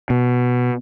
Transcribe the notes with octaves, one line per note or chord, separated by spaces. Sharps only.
B2